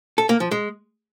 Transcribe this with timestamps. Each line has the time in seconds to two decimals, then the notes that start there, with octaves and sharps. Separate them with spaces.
0.18 A4
0.29 A#3
0.40 F3
0.51 G#3